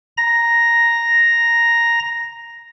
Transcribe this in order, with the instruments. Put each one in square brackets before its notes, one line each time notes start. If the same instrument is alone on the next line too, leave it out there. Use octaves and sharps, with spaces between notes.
[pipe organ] A#5 A#6